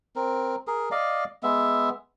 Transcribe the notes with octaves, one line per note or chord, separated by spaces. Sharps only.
C4 A#4
G#4 A#4
D5 D#5 F5
G#3 B3 E5